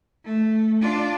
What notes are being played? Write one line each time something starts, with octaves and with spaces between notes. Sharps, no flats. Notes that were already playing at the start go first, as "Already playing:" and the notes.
A3
D4 F4